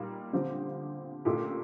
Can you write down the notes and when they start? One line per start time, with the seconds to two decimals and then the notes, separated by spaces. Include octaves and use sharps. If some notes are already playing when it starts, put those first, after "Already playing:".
Already playing: A#2 G3 A#3 D#4
0.33 D3 F3 C4 G4
1.25 A#2 A3 D#4 G4